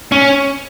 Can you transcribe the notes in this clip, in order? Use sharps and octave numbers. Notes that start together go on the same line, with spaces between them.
C#4